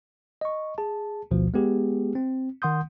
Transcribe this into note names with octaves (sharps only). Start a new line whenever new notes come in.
D#5 C#6
G#4 A5
A1 D2 B2 F3
G#3 B3 G4 G#4
C4
D#3 F#5 C6 D#6 G6